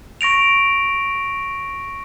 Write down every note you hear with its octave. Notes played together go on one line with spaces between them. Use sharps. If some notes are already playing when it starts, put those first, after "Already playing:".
C#6 A#6 D7 F7